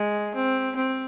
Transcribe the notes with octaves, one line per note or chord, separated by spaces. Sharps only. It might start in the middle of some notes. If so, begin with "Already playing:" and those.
Already playing: G#3
C4
C4